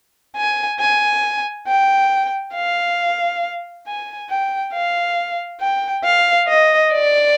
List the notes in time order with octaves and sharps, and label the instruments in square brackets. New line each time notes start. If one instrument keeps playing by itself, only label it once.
[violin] G#5
G#5
G5
F5
G#5
G5
F5
G5
F5
D#5
D5